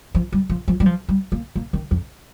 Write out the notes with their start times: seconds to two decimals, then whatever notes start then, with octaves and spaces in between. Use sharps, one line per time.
0.15 F3
0.32 G3
0.50 F3
0.68 F3
0.80 G3
0.86 F3
1.09 G3
1.32 A#3
1.56 A#3
1.73 D#3
1.91 F2